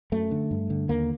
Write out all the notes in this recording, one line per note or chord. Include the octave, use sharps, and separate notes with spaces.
F#2 A3
D3
G2
D3
D#2 A#3